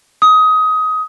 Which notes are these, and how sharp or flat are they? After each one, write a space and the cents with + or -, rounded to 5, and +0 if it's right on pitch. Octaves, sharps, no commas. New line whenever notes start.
D#6 +20